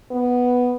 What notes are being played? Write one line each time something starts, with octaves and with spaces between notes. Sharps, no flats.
B3